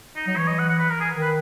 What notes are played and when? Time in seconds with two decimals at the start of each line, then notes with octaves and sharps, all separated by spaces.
0.16 D#4
0.27 F#3 D#4
0.37 E3 C#5
0.48 D#5
0.59 F#5
0.69 F#5
0.79 B4
0.90 A#4
1.01 G#4
1.11 D#3
1.22 B4